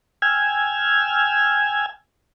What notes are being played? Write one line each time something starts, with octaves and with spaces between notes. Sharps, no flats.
G5 G#5 E6 F6 G#6